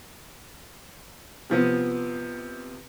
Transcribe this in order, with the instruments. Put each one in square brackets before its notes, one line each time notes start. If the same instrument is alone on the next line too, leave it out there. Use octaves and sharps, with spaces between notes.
[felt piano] C3 F3 B3